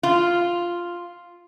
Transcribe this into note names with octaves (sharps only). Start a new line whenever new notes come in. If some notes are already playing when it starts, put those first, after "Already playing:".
F4